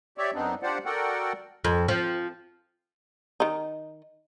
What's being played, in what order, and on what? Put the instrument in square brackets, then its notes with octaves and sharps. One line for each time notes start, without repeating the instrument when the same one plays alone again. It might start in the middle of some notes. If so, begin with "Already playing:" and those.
[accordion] G4 C#5 D5 E5
F#2 B3 C4 D4 D#4
D4 F4 G4 C5 D5 F#5
F#4 A4 A#4 D5 F#5 G5
[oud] F2
F3
[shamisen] D#3 D#4